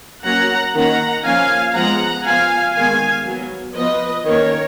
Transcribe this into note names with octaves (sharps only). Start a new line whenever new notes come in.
F#3 A#3 C#4 F#5 A#5
D#3 A#3 C#4 F#5 A#5
F3 A#3 C#4 F5 G#5
F3 G#3 B3 F#5 A#5
F3 B3 F5 G#5
D#3 G#3 B3 F5 G#5
F#3 B3
F3 B3 B4 D#5
D#3 A#3 C#4 A#4 C#5